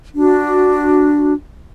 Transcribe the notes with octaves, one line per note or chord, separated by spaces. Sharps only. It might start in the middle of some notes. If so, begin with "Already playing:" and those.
D4 F#4